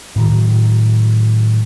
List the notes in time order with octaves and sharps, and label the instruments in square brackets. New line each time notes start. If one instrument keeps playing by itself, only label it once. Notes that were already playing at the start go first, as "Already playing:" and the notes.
[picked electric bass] A2 D#3 F#3